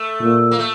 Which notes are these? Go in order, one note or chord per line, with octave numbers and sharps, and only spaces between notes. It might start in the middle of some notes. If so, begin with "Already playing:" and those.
Already playing: A3
A#2
A#3
A3